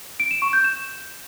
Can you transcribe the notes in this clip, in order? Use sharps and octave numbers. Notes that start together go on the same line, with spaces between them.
D7
E7
C#6
G6
E7